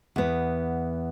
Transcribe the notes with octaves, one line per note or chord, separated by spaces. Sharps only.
E2 B3